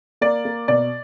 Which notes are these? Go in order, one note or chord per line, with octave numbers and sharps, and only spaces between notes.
A#3 D5
A#3
B2 D5